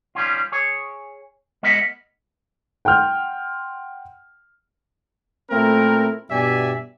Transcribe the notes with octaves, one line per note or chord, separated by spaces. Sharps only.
D#3 G3 C#4 F4
G#4 C#5
G#3 B3 A#4 D#5 E5 F#5
F#5 G5 C6 F6 G6
A#2 A3 C4 E4 A#4
G2 B2 G4 D5 E5 G#5